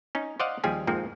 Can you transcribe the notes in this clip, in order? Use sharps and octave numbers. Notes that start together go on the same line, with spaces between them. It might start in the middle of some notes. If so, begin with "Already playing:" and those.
C#4 D#4
C5 D5 D#5 F5 F#5
D#2 F3 G3 G4 G#4 G#5
F2 G#2 F3 A#3 C4